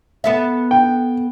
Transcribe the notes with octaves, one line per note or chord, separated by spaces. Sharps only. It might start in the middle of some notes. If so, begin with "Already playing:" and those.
B3 A4 E5
G5